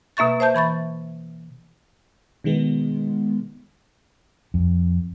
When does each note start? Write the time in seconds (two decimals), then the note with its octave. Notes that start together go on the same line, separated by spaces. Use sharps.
0.17 B2 A#3 E5 C#6 A6
0.40 C5 E5 A5 G6
0.55 E3 B5 C#6 A6
2.44 B2 D#3 G#3 B3
4.54 F2